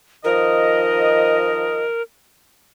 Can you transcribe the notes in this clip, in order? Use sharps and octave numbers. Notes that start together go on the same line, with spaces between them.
D#3 F3 A#4 D#5